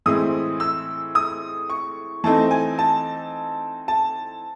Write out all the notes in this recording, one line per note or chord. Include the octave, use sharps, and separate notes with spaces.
A2 E3 G#3 C4 E4 D#6
E6
D#6
C#6
E3 A3 C4 D#4 A5
G#5
A5
A5